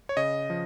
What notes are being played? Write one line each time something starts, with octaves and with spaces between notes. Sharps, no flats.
C#5
C#3 D#5
F3